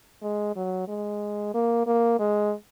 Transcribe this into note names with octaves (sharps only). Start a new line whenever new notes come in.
G#3
F#3
G#3
A#3
A#3
G#3